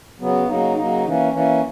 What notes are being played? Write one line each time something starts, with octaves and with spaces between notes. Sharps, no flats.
C#3 F#3 B3
C#3 F#3 A#3 D#4
C#3 F#3 A#3 D#4
E3 A#3 C#4
E3 A#3 C#4